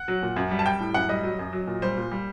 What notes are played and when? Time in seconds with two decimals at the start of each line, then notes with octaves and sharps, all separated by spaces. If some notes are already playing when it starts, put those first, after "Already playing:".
Already playing: F#5
0.08 F#3
0.23 A#2
0.36 F#2
0.51 G3
0.59 A5
0.66 G3 G5
0.81 A2
0.94 F#2 F#5
1.09 G3 D#5
1.24 F#3
1.39 F#2
1.53 F#3
1.67 A#2
1.82 G3 C5
1.97 A#2
2.12 G3